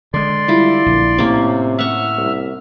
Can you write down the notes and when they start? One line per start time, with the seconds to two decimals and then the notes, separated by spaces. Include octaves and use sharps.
0.14 D3 G#3 D5 C6
0.48 G3 E4 F4
0.86 A#1 D3
1.18 A2 C3 A#3 C#4
1.79 E5 F#5 C#6 F6
2.18 C2